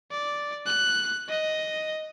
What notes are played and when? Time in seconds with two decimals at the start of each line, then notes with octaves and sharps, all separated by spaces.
0.11 D5
0.66 F#6
1.29 D#5